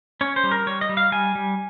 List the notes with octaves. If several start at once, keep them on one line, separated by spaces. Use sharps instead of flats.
C#4 C#5
C5
G3
A#4
G3 C#5
D#5
G3
F5
G3 G#5
G3